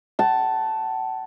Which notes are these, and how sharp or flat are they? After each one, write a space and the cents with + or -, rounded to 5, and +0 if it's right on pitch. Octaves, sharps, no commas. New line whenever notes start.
F#5 +40 A5 +0